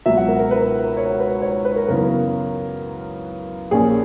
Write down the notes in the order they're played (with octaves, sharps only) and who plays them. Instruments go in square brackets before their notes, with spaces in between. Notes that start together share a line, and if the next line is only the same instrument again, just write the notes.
[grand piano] C#2 B2 F#3 E5
F#5
A#4
A#4
B4
C#5
B4
C#5
B4
A#4
F#2 C#3 E3 B3 A#4
A#1 A#2 A#3 C#4 G#4